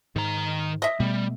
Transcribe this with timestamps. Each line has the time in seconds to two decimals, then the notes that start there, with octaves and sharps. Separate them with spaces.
0.16 G#2 D#3 A#5
0.82 D#5 E5
1.00 B2 G3 A3